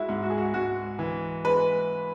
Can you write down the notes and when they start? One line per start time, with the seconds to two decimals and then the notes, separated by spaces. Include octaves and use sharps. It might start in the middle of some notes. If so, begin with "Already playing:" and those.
Already playing: G#3 E4 F#4
0.09 G#2
0.23 F#4
0.30 G#4
0.38 F#4
0.54 G#2 F#4
0.99 E3
1.45 G#3 B4